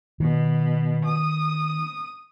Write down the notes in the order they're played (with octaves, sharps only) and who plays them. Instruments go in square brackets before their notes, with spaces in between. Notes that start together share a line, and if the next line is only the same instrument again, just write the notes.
[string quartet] B2 [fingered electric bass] D#3
[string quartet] D#6